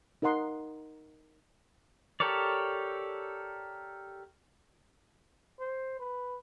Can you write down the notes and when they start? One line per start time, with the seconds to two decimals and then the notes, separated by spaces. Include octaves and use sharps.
0.22 D#4 A#4 D#5 F#5 C6
2.20 G4 A4 A#4 C#5 D5
5.59 C5
5.99 B4